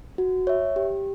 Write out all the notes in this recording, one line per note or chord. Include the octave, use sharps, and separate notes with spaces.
F#4
C#5 E5
G4